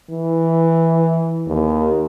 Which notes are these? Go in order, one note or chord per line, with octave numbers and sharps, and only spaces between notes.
E3
D#2